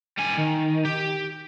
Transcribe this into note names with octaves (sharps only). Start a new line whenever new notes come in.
G3 G#5
D#3
G4